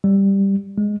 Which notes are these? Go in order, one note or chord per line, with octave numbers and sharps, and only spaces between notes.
G3
G#3